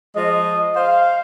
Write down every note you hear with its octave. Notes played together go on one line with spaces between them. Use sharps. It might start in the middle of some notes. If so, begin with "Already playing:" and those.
F3 G#3 D#5
C5 F5